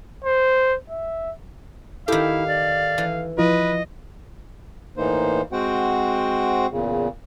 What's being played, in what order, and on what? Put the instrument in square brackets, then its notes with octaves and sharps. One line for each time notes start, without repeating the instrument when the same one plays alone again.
[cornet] C5
E5
[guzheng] D#3 G4 [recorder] E4 [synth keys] A4 [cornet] F5
[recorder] D5
[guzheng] E3
[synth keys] F3 E4 F4 [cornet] B4 [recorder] D#5
[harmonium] A2 E3 A#3 D#4 C5
G#3 C4 F#4 C5 F#5 G5
E2 A#2 C#3